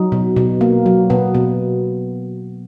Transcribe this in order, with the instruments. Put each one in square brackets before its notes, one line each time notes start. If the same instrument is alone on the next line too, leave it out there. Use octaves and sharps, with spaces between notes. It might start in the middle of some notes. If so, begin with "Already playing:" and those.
Already playing: [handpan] F#3 D#4
B2
B2
A#3
F#3
B2 B3
B2